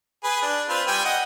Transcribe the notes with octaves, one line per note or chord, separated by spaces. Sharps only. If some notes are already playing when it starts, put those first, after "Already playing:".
G#4 B4
D4
C4 F4 B4
G3 G5 G#5
D#5 F#5